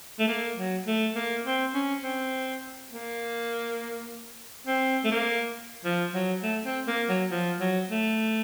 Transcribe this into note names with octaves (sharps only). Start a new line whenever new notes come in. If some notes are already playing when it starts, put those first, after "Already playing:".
A3
A#3
F#3
A3
A#3
C4
C#4
C4
A#3
C4
A3
A#3
F3
F#3
A3
C4
A#3
F#3
F3
F#3
A3